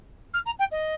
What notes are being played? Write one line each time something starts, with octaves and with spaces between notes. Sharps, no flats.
F6
A#5
G5
D#5